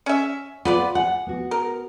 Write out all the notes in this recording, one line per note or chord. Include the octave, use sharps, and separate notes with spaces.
C#4 E5
B3 F4 B4 D5
G#4 F#5
B3 F#4
A#4